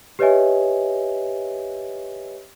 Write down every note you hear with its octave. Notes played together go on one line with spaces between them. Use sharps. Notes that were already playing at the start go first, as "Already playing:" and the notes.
G4 B4 C#5 D#5 E5 G#5